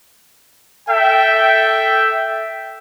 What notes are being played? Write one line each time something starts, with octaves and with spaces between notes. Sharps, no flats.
A4 E5 G5